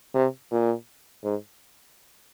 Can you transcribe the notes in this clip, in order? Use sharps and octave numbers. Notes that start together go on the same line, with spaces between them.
C3
A#2
G#2